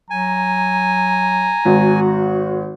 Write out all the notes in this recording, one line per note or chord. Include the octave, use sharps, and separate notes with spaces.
F#3 G#5 A#5
G#1 F#4